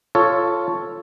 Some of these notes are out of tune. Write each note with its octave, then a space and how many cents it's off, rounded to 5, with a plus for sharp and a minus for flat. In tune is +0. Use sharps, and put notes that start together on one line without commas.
F4 -5 A4 +0 C#5 +0